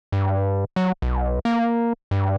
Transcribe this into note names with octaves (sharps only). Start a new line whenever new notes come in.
G2
F#3
B1
A#3
G2